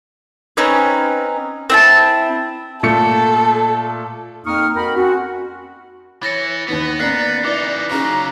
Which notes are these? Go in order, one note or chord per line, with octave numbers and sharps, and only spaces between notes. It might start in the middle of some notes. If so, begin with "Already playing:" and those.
C4 C#4 D#4 B4
C4 E4 A5
A#2 A3 A4 C#7
F2 A#3 D#4 C#6 D#6 F6
F2 F#4 A#4 G5 B5
C4 C#4 F#4
E3 C#5 A6 A#6 C#7
D#2 D#3 B3 B4
A#3 C#4 D5 A#5 F#6 B6 C7
E3 D#4 E4 B4 D6
C#3 F#3 C#4 D#4 G#4 A#5